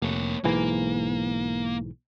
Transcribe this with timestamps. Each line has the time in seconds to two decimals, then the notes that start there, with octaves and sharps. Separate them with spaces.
0.02 F1 A#3 C#5
0.44 B1 G#2 E3 A#3